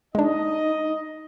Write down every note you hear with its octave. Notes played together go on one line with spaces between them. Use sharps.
G#3 D4 D#4 D#5